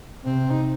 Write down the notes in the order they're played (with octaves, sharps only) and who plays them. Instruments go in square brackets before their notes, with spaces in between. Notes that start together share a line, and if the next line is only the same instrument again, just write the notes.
[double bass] C3 [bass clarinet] C4
[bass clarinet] D#4